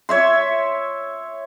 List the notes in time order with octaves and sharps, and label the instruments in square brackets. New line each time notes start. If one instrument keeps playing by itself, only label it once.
[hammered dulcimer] C#5 E5 C6